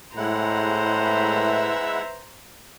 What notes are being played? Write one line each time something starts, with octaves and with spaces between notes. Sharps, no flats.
A2 G#3 E4 C5 F#5 A#5
B4 E5